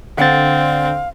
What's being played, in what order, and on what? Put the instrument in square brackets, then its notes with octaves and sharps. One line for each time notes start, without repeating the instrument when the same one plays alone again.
[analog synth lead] D3 [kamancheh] C4 [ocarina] F5 [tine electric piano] F#5 A6